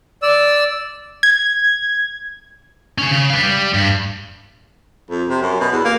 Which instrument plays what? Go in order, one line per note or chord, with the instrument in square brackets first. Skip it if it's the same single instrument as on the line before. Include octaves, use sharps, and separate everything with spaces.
[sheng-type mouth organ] D5 E6
[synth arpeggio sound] G#6
[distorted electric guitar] C#4 G#4
C#3
B4 F5
G3
G2
[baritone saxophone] F2
C3
F#2
B2
E2
A#3